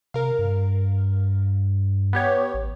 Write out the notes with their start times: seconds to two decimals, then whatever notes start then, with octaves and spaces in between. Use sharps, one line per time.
0.14 C3 A#4 F5
0.39 G2
2.13 B3 G4 C#5
2.54 A1